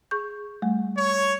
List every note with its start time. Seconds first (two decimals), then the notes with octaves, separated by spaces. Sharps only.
0.11 G#4 C#6 G6
0.62 G3 A3
0.97 C#5